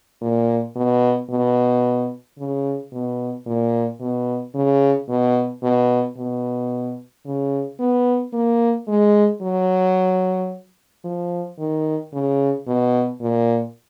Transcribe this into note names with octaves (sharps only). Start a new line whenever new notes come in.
A#2
B2
B2
C#3
B2
A#2
B2
C#3
B2
B2
B2
C#3
B3
A#3
G#3
F#3
F3
D#3
C#3
B2
A#2